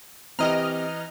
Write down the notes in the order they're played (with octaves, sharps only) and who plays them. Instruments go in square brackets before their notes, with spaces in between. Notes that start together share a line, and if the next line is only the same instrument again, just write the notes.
[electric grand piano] E3 A#5 [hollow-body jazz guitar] C4 G4 [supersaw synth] D#5 F6